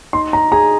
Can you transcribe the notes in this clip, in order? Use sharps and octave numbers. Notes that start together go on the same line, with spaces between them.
D#4 C6
A#5
G#4 A#5